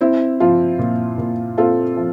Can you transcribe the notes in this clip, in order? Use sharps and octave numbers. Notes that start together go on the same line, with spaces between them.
C4 E4
F3 F4
A#2
A#2
C4 F4 A4
F3